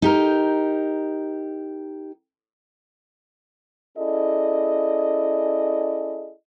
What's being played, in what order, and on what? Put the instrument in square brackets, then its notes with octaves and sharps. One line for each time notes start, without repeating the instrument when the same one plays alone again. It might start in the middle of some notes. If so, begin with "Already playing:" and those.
[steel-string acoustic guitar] D#4 G4 A#4
[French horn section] C#4 E4 G#4 A4 D5 D#5